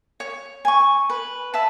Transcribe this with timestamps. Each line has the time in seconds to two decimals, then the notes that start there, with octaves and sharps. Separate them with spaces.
0.20 C#5
0.65 G#5 C#6
1.10 B4
1.54 E5 A5